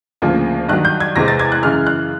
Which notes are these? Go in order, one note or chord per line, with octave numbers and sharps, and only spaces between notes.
D2 C#3 F3 A#3
G2 D#3 F#3 F#6
G6
G#6
E2 C3 E3 G#3 C4 A#6
A6
G#6
F#6
F#2 C#3 E3 G#3 F6
F#6